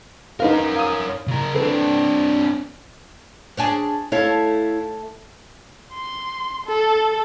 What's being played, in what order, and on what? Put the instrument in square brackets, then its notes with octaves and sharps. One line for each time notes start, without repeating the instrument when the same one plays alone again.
[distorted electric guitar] C#4 A#4 [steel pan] D#4 B4 F5
[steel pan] F5 D#6
[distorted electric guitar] C#3 A#4
[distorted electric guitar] C4 D4 [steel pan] A4 B4
[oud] C#4 D4 G#4
[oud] A3 A4 [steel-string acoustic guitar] E4 C#5 F5
[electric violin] C6
A4